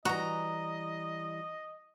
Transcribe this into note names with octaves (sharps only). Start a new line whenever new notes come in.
E3 G3 F#4 D#5 A#5